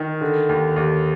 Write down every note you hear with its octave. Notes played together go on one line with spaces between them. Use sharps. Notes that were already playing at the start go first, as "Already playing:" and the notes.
Already playing: D#3
D3
D#2
D#2